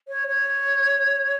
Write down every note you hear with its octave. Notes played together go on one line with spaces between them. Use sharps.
C#5
C#5